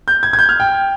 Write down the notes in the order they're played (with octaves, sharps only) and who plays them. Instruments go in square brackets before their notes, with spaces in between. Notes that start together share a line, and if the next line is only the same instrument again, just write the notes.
[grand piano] G6
G#6
G#6
G6
F6
G5